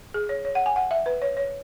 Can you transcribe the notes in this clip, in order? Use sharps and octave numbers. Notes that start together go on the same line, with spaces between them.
G#4
C#5
C#5
F#5
G#5
F#5
E5
B4
C#5
C#5